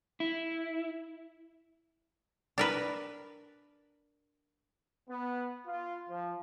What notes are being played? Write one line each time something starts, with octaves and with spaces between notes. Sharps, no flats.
E4
D4 A#4 B4
B3
F4
F3